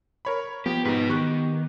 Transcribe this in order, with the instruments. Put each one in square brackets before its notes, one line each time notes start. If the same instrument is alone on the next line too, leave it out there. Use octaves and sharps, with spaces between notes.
[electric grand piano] A#4 C#5 B5
[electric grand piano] F3 [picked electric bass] B3 [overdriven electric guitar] G4
[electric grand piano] G#2 D#4 [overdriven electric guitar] F#4 B4
[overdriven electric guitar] D#3 [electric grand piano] G4 C#6 F#6